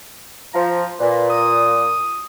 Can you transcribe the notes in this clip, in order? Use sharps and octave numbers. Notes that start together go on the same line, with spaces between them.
F3 A#5
A#2 B4
D#6